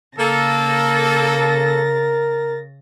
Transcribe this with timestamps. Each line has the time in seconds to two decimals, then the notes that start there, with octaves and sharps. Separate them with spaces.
0.18 C#3 A#3 A4 A6 A#6
1.38 A#4